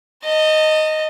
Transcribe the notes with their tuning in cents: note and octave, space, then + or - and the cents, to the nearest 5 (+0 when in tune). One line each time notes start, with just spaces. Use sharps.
D#5 +0 A5 +40